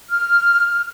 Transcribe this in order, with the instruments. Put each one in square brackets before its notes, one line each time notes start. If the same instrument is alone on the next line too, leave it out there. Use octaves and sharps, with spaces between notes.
[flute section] F6